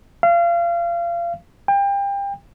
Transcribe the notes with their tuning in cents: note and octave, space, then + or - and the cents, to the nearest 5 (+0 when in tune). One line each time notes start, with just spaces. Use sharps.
F5 -30
G5 +30